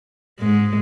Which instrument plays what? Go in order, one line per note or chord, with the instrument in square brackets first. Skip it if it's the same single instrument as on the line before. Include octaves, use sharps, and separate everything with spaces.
[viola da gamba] G#2 G#3